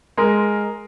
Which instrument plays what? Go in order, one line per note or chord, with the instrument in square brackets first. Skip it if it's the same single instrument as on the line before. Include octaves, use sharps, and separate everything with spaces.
[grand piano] G#3 A#4